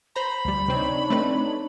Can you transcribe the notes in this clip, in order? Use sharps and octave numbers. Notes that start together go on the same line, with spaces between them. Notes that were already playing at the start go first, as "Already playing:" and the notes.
C5 A#5 B5
D2 G3
C3 C4 D4 D#4 C#5
A3 C4 B4